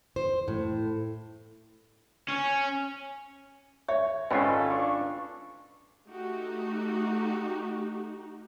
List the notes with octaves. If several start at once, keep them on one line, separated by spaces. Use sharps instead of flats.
C5
A2
C#4
C#5 E5
G#1 C#4 F4 A4 B4 G5 G#5
D4 C#6
A3 D#4 F#4 G4